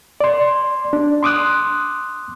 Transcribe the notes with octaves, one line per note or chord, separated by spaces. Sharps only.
D5 C6
D4
C6 D6 D#6 F#6